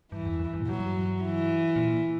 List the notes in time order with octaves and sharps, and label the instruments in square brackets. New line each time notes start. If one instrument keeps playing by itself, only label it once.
[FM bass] G2 [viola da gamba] E3
[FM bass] E2
F#2
G2
A#2
[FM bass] G2 [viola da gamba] F#3
[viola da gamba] E3
[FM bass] A#2